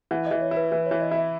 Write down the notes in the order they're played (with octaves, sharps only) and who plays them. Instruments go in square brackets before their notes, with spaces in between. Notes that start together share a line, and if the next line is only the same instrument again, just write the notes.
[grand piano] E3 [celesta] F#5
[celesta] D#5
[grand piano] E3
[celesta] C#5
[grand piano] E4
[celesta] B4
[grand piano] E3 [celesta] B4
[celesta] C#5
[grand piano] E3
[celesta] D#5
[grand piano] E4 [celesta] E5